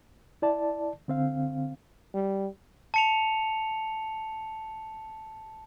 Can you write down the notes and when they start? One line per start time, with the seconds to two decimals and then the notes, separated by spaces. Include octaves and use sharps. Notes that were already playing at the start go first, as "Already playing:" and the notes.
0.42 E4 D5 A5
1.08 D3 C4 F5
2.14 G3
2.94 A5 C#7 F7